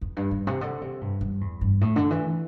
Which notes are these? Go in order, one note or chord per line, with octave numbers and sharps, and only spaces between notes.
E2
G2
G2
C3
D3
C3
G2
G2
E2
G2
A2
D3
E3